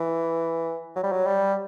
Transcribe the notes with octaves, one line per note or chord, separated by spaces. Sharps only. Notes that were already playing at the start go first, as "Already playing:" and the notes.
Already playing: E3
F#3
G3
F#3
G3